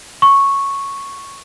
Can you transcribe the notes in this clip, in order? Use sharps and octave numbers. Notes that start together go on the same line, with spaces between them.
C#6